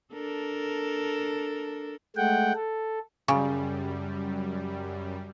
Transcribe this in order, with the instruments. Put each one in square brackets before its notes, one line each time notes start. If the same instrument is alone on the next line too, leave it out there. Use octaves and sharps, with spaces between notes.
[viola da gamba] D4 A4 A#4
[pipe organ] G#3 A3 F#5 G5
A4
[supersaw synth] F#2 G3 [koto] C#3